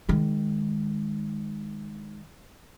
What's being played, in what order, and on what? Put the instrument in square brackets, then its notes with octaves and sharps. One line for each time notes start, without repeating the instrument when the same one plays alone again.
[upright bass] D#3 G#3